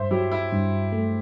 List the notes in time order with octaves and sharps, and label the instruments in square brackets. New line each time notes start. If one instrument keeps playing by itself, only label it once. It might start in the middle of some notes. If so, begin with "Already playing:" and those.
Already playing: [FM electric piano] G2 [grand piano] C5 E5
[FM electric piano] F#3 [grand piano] E4 G4
[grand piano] E4
[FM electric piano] G2
A3